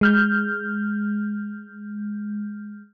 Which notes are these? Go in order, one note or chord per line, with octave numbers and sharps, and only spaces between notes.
G#3 F6 G6